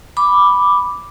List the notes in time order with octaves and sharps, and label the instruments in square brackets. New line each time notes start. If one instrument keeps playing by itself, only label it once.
[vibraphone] B5 D6